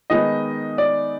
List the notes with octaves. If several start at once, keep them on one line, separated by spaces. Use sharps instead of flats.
D#3 G#3 B3 D#4 D#5
D5